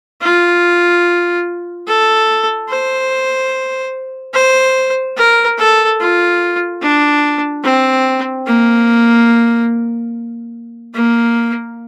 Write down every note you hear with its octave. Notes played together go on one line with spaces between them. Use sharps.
F4
A4
C5
C5
A#4
A4
F4
D4
C4
A#3
A#3